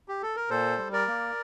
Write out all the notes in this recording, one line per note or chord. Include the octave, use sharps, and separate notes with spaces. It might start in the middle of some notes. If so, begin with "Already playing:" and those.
G4
A4
A#4
A#2 A4 C5
G3
A#4 D5
A#3